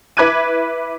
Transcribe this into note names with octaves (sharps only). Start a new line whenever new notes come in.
E4 B4 D6 F#6 G#6 D#7